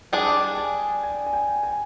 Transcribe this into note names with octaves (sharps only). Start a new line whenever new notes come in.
G3 D4 G#4 G5
G#5
G#5
G#5
G5
G#5